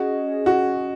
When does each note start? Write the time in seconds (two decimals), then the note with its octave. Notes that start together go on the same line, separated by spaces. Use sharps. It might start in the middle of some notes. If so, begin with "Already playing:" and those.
Already playing: C#4 F#4 G#4 D#5
0.46 F#4